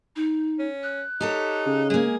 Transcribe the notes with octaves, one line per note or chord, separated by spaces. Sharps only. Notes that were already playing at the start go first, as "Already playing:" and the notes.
D#4
C#4
F#6
D#4 G4 A4 C#5
C#3
G#3 A#3 G#4